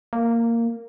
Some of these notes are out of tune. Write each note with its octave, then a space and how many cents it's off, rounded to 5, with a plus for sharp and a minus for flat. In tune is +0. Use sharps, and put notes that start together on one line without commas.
A#3 -10